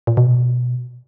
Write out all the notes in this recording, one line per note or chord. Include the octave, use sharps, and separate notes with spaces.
A#2
B2